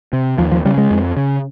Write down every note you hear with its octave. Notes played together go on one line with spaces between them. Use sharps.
C3
D#2 F3
F3
C#3 G3
G#3
F2
C#3